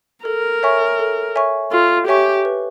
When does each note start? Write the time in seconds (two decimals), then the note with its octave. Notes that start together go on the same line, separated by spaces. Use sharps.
0.25 A4 A#4
0.63 C#5 E5 G#5 C#6
0.99 A4
1.36 C#5 E5 G#5 C#6
1.72 F4 A4
2.07 G4 C#5 E5 G#5 C#6
2.45 B4